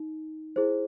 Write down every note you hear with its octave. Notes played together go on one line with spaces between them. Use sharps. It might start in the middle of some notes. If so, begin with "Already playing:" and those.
Already playing: D#4
E4 G#4 C5